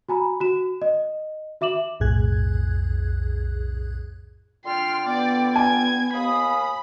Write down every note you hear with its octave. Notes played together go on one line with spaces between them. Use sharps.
F#4 G#5 A#5 B5
F#4 E7
D#5
F#4 E5 D6 E7 F#7
B1 F2 A2 G#4 F#6 G#6
D3 F4 G5 C6 F6
B3 D5
G#5 G#6
D#2 F5 B5 D#6